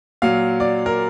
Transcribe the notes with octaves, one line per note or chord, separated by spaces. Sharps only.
A#2 F#3 F5
D5
A#4